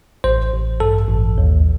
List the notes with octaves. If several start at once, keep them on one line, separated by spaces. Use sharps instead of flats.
A1 C5
A1
G2 A4
A1
D#2